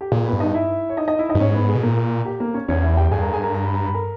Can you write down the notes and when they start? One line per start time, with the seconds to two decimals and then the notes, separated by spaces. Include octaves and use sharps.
0.01 G4
0.12 A#2 G#4
0.26 B3 B4
0.33 G2
0.40 D#4 D#5
0.54 E4 E5
0.90 C#5
0.97 D#4 D#5
1.08 D#4 D#5
1.19 E4 E5
1.29 D#4 D#5
1.35 G2
1.40 G#2 C#4 C#5
1.54 B3 B4
1.69 G#4
1.75 B2
1.83 A#2 A#3 A#4
2.25 G4
2.40 A#3 A#4
2.54 C#4 C#5
2.68 E2 C#4 C#5
2.83 E4 E5
2.97 G4 G5
3.11 G2 G#4 G#5
3.22 A#4 A#5
3.33 G#4 G#5
3.43 A#4 A#5
3.54 A#5
3.64 B5
3.75 A#5
3.84 B5
3.94 A#4 A#5